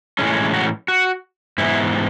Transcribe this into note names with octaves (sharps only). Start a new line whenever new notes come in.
A2 E3 G#3 C#4
F#4
F#4
G#2 E3 B3 E4